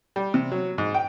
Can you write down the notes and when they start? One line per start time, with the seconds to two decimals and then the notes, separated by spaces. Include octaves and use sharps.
0.16 G3
0.34 C3
0.52 F#3
0.78 G#2
0.94 G5